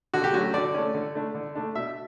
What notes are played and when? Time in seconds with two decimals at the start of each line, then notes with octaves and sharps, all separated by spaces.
0.14 D3 F#4
0.24 G4
0.33 F#3 A3 C#4 F#4
0.54 D3 D5
0.74 A3 C#4
0.94 D3
1.15 A3 D4
1.35 D3
1.55 A3 D4
1.75 B2 E5